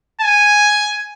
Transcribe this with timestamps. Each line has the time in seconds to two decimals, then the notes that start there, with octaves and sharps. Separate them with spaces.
0.21 G#5